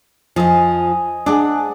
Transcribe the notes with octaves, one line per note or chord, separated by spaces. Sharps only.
F2 F3 C5 D#5 G#5
G#3 D4 G#4 D5 F#5